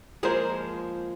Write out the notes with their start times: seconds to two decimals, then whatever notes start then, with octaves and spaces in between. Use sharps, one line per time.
0.23 F3 G#3 A#3 G#4 A#4 C5